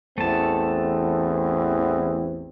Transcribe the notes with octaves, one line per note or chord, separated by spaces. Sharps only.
A1 E2 A3 C4 A5